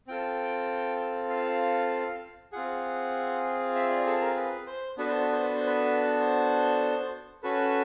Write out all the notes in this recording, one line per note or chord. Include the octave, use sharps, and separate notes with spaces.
C4 F4 A4 G5
F5
C4 F4 G#4 F#5
E5
D5
A4
A#4
B4
C5
B3 D4 F#4 A4 B4
C5
B4
C5
B4
C5
B4
C5
C#4 F#4 A4 B4